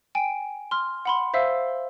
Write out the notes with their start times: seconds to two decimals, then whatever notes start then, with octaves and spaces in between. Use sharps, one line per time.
0.15 G5 G#5 D7
0.71 C6 F6
1.05 F#5 B5 C6
1.34 C5 E5 F5 E6